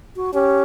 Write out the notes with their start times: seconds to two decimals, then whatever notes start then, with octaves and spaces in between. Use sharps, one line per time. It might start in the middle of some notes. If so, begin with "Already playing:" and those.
0.16 F#4
0.33 C#4 G4